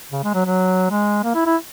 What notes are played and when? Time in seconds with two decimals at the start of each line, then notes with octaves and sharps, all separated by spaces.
0.12 C#3
0.24 G#3
0.34 F#3
0.46 F#3
0.90 G#3
1.24 A#3
1.35 E4
1.46 E4